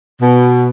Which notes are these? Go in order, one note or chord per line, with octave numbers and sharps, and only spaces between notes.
B2